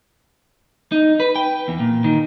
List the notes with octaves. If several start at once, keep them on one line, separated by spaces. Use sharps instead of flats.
D#4
B4
G5
E2
A#2
D#3